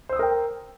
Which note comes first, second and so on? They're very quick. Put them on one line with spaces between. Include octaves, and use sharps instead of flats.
C5 E6 D#6 A#4 G5